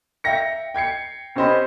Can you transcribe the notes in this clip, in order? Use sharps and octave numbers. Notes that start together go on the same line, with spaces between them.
E5 F5 G5 A#6 C#7
G5 G#6 C7 C#7
C4 C#4 G4 C5 D#5 B5